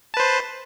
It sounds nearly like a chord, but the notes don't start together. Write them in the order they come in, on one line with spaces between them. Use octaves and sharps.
A5 B4 C5